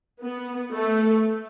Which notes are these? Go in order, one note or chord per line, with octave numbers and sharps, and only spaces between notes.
B3
A3